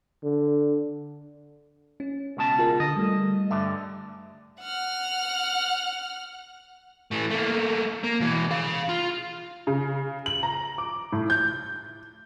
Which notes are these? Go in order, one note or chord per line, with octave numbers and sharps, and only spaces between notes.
D3
C#4
C#2 B2 A5
F4 G#4 A#4
D3 D#5
G3 A3
G2 D3 E5
F#5 F6
E3 A3
A3 A#3
A#3
B2 E3
G#4 F5
F4
C#3
F#7
A#5
D6
A2
G6